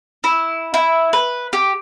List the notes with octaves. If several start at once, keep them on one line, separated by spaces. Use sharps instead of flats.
E4
E4
B4
G4